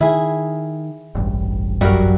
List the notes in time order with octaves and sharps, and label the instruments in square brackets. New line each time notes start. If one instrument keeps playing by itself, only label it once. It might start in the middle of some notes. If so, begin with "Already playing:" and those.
[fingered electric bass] D#3 [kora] E4 G#4
[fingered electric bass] E1 A1 G2
[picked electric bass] F#2 F#3 [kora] G3 F#4 A#4